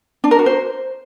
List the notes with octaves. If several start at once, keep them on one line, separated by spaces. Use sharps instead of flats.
D4
A#4
F#4
C5